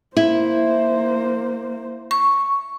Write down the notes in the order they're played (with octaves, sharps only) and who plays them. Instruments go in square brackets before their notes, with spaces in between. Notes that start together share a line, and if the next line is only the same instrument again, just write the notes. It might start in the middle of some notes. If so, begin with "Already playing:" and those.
[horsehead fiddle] A#3 C5 [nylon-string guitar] E4
[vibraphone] C#6